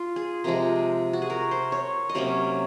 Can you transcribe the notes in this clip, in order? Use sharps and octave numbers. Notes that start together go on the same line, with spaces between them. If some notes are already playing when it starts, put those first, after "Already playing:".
Already playing: F4
G#4
C3 F3 G#3 A#4
F#4
G#4
A#4
C5
C#5
D#5
C3 F#3 A#3 C#4 C#5